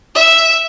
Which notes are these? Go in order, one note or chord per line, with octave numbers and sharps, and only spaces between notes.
E5